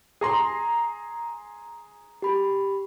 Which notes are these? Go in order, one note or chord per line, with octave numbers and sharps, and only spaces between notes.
G#4 A#5 C6
G4 B5